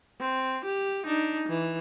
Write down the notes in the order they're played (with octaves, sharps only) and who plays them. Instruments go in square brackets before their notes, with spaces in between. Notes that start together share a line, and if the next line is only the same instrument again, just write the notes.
[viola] C4
G4
D4 D#4
E3